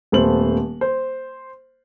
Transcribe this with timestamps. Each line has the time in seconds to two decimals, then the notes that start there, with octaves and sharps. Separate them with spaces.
0.12 D#1 A3 B3 C5 F#7
0.81 C5